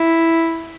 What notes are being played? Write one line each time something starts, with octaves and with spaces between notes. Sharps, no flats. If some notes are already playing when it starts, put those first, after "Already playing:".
Already playing: E4